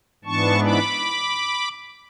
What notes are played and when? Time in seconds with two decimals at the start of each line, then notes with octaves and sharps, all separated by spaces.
0.24 G#2 E3 B3 D4 A5 C#6
0.63 B5 D6